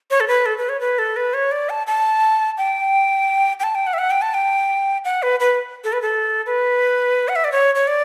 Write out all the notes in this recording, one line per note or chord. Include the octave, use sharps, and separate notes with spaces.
C#5
A4
B4
A4
B4
C#5
B4
A4
B4
C#5
D5
A5
A5
G5
G5
A5
G5
F#5
E5
F#5
G5
A5
G5
F#5
B4
B4
A4
B4
A4
B4
F#5
E5
D5
C#5
C#5
D5